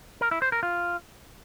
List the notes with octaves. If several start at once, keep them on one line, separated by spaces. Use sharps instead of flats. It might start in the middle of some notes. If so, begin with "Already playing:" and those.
A#4
E4
C5
A#4
F4